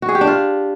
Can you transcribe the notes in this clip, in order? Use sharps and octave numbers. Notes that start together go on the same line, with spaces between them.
F#4
G#4
G4
D4
F4